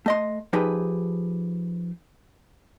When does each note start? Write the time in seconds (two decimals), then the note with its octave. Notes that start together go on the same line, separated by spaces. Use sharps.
0.06 A3 D#5 C6
0.53 F3 D#4 G4 G#4 B4